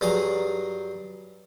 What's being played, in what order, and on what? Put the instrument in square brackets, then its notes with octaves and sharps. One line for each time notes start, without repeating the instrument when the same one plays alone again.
[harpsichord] G2 F#3 G#4 A#5